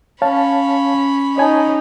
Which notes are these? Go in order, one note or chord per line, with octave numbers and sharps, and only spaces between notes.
C#4 C#5 F5 A5 B5
D#4 C#5 G#5 A5